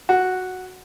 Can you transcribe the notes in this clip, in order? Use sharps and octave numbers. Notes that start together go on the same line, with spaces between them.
F#4